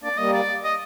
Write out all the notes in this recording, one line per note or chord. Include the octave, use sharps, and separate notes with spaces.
A#3 D4 D5
G3 A#3 D#5
D5
D#5